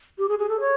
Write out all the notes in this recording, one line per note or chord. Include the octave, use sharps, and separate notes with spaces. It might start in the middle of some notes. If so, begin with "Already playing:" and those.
G4
G#4
G#4
A4
C#5